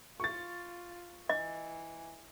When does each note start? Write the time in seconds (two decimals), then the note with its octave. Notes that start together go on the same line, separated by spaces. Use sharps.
0.20 F4 C#6 A6
1.29 E3 D#5